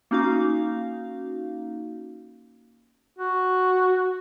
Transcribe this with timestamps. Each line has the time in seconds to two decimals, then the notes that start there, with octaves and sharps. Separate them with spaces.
0.11 A#3 C#4 D#4 F#4 F5
3.19 F#4